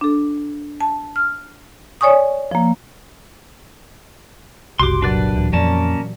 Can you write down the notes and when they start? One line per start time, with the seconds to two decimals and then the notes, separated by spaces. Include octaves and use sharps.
0.01 D4 A4
0.81 A5
1.16 F6
2.01 C#5 D5 G#5 C#6 D#6
2.51 F3 A#3
4.79 F#1 C2 F#4 G4 C6 D6
5.02 A#2 F#3 D4 B4 D5
5.36 D1 E3
5.53 F2 A#3 C#4 D5 A5